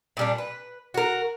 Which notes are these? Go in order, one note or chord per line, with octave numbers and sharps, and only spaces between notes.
A#2 G3 D4
B4
F#4 A#4